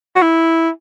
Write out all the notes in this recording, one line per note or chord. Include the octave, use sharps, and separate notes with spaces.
F#4
E4